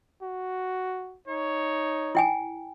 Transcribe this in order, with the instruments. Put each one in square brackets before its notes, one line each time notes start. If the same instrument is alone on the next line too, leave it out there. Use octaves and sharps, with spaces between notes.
[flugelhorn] F#4
[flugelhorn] D#4 [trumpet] C#5
[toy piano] E4 G5 G#5